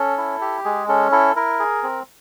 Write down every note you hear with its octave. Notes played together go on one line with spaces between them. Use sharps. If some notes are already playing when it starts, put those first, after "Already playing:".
Already playing: C#4 A4
E4
G4
G#3 G#4
C#4 A4
E4 A4
E4 A#4
G#4
C4